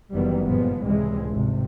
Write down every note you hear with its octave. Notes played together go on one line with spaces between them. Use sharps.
F#1 D#3 E3 G3 B3
G1 A#2 F3 G#3 B3
C#2 A2 C3 E3 G3 G#3
G#1 C3